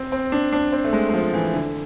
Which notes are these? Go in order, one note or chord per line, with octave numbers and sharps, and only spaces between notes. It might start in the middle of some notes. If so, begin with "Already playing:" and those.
Already playing: C4
C4
D4
D4
C4
A3
G#3
G#3
F3
E3
D3